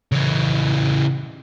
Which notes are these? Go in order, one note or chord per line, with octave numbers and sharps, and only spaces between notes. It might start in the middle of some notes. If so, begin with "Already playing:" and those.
C#3 E3